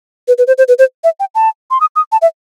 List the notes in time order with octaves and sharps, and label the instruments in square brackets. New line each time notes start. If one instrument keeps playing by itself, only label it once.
[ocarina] B4
B4
C5
C5
B4
C5
E5
G5
A5
C6
D#6
D#6
A5
E5